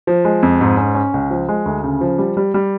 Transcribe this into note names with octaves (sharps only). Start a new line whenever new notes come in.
F3
G#3
F2
G#2
C#4
C#4
C#2
F3
G#3
D2
C#3
F3
G3
G3
G3